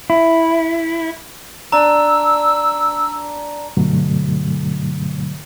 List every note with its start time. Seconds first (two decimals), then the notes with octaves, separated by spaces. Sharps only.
0.10 E4
1.72 D4 A#5 E6
3.77 G2 B2 D3 F#3 A3